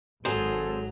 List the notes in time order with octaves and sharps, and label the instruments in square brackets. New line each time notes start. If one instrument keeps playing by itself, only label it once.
[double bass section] G#1 [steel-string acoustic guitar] F#3 [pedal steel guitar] G#4 C5 [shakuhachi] A4